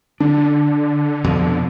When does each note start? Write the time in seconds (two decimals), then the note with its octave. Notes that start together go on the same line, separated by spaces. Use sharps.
0.20 D3 D4
1.24 F1 F2 B2